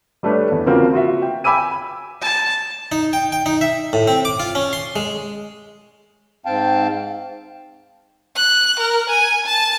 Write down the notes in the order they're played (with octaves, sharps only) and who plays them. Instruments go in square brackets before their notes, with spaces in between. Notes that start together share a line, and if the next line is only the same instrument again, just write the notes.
[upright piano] G3 A3 D4 B4 C#5
E2
C#3 F3 A#3 C4 F#4
F4 F#4 E5
G5
G5 G#5 B5 D6 E6 D#7
[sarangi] A5
[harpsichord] D#4
G5
G5
D#4
E5
A2
C4
D6
F4
C#4
C6
G#3
[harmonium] G#2 C4 F5 G5 A5
[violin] F#6
A#4
G#5
A5